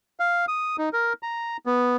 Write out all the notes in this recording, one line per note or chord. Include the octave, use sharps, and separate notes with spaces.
F5
D#6
D#4
A#4
A#5
B3